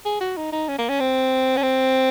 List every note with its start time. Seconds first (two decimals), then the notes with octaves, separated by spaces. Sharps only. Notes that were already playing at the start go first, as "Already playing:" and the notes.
0.05 G#4
0.21 F#4
0.37 D#4
0.52 D#4
0.68 C#4
0.78 A#3
0.89 C#4
1.00 C4
1.57 C#4
1.63 C4